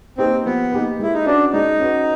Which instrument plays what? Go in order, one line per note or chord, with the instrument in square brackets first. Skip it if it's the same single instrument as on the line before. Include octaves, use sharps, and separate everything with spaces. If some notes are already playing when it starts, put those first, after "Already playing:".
[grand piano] A#3 D#4 G4 B4 [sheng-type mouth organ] C4
[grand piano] F3 [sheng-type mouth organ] B3
[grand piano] A#3 D#4 G4 B4
[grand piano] G#3 [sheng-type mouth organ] E4
[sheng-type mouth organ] D#4
[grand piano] C#4 F#4 B4 [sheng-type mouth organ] D4
[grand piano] G#3 [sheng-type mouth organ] D#4
[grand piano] C#4 F#4 B4